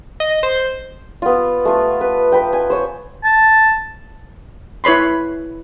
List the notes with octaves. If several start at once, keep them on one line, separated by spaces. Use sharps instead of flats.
D#5
C5
B3 F4
A3 F4
B4
B4 G5
G#5
C5 C#5
A5
E4 B4 C#5 B5 C6